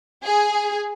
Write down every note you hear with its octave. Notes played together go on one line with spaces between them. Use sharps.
G#4